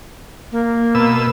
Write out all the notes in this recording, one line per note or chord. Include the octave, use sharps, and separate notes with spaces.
A#3
B2 E6